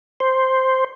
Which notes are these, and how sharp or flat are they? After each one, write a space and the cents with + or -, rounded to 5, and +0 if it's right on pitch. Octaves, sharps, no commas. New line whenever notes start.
C5 +0